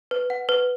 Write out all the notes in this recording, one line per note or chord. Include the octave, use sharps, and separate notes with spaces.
B4
F#5
B4